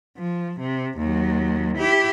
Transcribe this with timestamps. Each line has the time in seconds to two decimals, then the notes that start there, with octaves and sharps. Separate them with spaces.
0.18 F3
0.60 C3
0.99 D#2 F#3
1.77 E4 G4